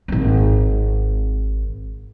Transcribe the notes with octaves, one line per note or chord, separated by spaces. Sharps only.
G#1 C4